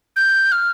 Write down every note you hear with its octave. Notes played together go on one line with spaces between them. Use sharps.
G6
F6